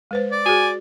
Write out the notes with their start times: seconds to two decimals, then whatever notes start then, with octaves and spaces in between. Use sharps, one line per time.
0.11 G#3 B4 C5
0.32 D5
0.46 F#4 G#4 G#5